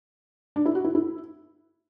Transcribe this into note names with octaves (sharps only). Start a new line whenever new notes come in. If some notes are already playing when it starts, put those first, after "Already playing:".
D4
E4
F#4
E4
E4